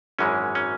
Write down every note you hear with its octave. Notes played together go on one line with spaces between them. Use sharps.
G#1 F#2 E3 G#3 C#4
C#4